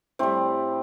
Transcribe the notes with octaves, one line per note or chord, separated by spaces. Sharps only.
A2 G3 C4